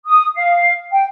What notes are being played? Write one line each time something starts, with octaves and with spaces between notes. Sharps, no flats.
D#6
F5
G5